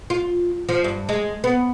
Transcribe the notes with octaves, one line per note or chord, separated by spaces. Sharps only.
F4
F3
G2
G#3
B3